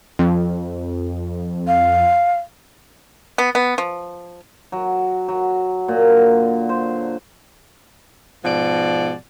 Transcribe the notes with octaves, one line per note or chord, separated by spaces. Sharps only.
F2
F5
B3
B3
F3
F#3
F#3
A#2
D3
C5
G#2 B2 F3 D5